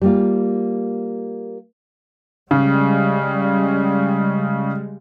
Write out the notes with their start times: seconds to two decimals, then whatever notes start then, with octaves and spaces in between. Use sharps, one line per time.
0.01 G3 A#3 F4
2.51 C#3 G3 G#3